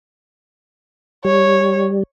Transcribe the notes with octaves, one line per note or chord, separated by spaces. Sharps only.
G3 C#5